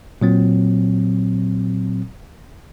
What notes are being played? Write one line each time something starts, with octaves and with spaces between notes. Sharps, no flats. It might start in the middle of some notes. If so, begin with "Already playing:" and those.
A#2 F#3 C4